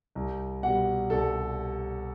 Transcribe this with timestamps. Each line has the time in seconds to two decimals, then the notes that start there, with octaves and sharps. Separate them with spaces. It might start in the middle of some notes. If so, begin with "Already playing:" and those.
0.15 C2
0.63 B2 G3 F#5
1.10 C2 A4